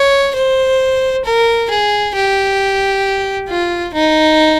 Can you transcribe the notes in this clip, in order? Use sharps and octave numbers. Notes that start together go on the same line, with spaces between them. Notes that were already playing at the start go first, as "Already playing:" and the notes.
Already playing: C#5
C5
A#4
G#4
G4
F4
D#4